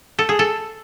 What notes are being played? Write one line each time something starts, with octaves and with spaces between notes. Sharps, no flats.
A4
G#4
A4